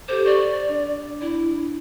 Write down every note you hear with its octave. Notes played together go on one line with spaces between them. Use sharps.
G4 A4 C5 D6
D5 C#6
D4
E4